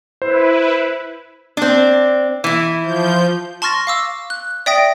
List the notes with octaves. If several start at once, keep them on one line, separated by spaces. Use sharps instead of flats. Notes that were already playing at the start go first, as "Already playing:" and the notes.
E4 B4 C5
C4 D4
E3 E4
F3 G6
A5 C6 C#6 F6 A6 A#6
F5 D6 E6
F#6
D5 E5 G5 D#6 A#6 D7